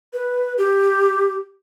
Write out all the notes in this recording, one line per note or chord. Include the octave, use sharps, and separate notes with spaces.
B4
G4